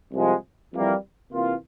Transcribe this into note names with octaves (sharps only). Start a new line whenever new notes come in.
C2 C3 F3 G#3
F2 E3 G3 A#3 E4
C3 E3 A#3 F4